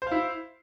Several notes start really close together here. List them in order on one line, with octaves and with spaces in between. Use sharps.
C5 F5 E4